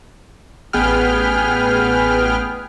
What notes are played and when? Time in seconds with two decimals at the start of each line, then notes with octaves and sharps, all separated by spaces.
0.73 A1 B3 G#4 B4 G5 F6